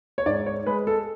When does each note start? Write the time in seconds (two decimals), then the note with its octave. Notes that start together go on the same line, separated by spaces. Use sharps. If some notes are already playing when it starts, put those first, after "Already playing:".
0.18 C#5
0.26 G#2 D5
0.46 C#5
0.66 G#3 B4
0.87 A4